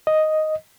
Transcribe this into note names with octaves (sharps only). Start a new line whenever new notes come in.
D#5